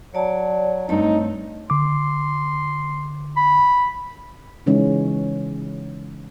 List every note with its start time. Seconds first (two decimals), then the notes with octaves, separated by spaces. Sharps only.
0.14 F#3 C#5 D5 A5
0.89 G2 A3 C4 D#4 C#5
1.70 D3 C6 D6
3.36 B5
4.66 C#3 E3 G#3 C#4 D#4